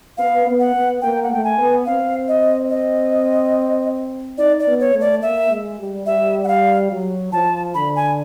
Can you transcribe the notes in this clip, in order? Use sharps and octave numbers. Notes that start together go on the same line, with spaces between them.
B3 F5
B3
F#5
B3
A#3 G5
F#5
A3 G5
G#5
B3
C4 F5
D#5
D#5
D#4 D5
D5
B3
C#5
A3
D5
A#3 E5
G#3
G3
G3 E5
F#5
F5
F#3
F3 A5
D3 B5
G#5